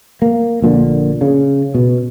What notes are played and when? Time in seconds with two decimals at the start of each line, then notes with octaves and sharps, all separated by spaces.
0.22 A#3
0.62 A#1 A#2 D3
1.21 C#3
1.74 B2